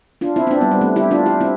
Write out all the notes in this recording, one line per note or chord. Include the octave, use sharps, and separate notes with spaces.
D4 F4
C4 E4
C4
B3 D4
G3 B3
G3 B3
A3 C4
E4 G4
D4 F4
E4 G4
C4 E4